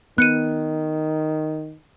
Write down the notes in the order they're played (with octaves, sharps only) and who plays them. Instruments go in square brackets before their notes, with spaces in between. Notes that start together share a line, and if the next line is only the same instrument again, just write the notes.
[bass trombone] D#3 [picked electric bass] B3 [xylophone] F#6 C#7 D#7